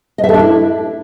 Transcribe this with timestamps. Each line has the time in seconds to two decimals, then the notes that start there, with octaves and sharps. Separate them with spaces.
0.18 D#5
0.24 E5
0.29 A4
0.34 D4
0.39 E4